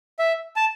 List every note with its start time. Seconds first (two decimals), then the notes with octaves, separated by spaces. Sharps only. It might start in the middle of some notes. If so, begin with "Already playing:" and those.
0.19 E5
0.56 A5